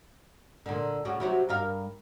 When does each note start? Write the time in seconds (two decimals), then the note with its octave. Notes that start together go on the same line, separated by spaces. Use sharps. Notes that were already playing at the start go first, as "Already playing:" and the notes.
0.66 A#2 D3
1.05 A2 C#3 F#4
1.20 C3 F#3 F#4
1.49 G2 A#4 F5